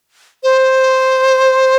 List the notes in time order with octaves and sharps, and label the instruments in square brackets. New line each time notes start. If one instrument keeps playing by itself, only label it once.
[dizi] C5